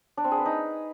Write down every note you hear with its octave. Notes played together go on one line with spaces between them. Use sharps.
D4
C4
G#4
B4
D#4